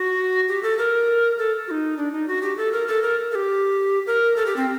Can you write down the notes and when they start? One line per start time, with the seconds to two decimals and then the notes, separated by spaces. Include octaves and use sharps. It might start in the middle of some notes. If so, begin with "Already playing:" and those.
Already playing: F#4
0.48 G4
0.63 A4
0.79 A#4
1.38 A4
1.68 F#4
1.71 D#4
1.97 D4
2.12 D#4
2.28 F#4
2.43 G4
2.57 A4
2.73 A#4
2.87 A4
3.03 A#4
3.32 A4
3.35 G4
4.07 A#4
4.36 A4
4.46 G4
4.56 C4